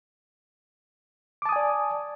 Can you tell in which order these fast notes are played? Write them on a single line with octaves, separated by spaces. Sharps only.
D6 A5 D#6 G#5 D5